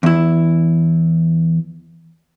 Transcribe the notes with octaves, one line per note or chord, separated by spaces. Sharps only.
E2 E4